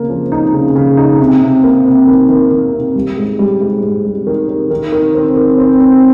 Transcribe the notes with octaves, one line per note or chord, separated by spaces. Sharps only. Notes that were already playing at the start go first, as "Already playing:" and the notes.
Already playing: C#3 A#3
F3
D#4
C#3
C#3
D#4
C3
C3
A#3
C3
D#3
D#3
D#3
C3
G3
G#2
G3
G#2
G#2
G3
D#3
D#3
D#3
D#3
C4
D#3
C4
C4